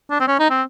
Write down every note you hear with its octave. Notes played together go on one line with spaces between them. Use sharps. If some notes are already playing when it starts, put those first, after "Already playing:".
D4
C4
C#4
D#4
C4